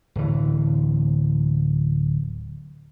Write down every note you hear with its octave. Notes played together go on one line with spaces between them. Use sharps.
D1 E3